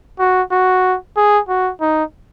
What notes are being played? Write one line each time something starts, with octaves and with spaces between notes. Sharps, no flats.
F#4
F#4
G#4
F#4
D#4